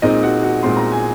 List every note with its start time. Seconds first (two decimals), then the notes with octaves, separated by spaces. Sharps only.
0.02 A#2 G#3 C4 D#4 D#5
0.23 F#4 F#5
0.43 F#4 F#5
0.63 A#2 G#3 C4 C6
0.77 A#5
0.92 G#5